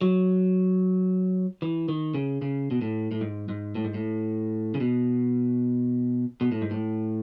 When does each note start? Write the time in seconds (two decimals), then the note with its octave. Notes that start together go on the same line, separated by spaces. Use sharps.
0.01 F#3
1.62 E3
1.89 D#3
2.14 C#3
2.42 C#3
2.71 B2
2.81 A2
3.11 A2
3.21 G#2
3.49 G#2
3.75 A2
3.84 G#2
3.94 A2
4.75 C#3
4.81 B2
6.41 B2
6.52 A2
6.62 G#2
6.71 A2